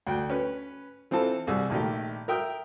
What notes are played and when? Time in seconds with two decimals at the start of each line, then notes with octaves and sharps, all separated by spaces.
0.07 D2 G5
0.30 C#4 B4
1.11 E3 C4 F4 A4
1.47 C2 G3 G#4 E6
1.70 A#1 D#3 A3 G4
2.28 A#4 E5 G5 D#6